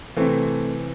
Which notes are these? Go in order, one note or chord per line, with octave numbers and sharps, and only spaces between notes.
C3 E3 A3 C4